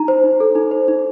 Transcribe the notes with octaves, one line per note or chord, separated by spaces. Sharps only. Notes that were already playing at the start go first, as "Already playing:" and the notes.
Already playing: D#4 A#5
C5
D#4
A4
D#4
C5
D#4